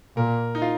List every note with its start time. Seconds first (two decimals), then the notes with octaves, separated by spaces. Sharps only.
0.16 A#2 A#4
0.55 D#4
0.62 F4